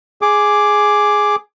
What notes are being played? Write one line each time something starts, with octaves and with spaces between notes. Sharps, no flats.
G#4 D6